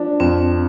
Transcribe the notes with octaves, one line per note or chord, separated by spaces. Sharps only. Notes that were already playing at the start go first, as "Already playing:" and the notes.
Already playing: F3 D4
F2 C4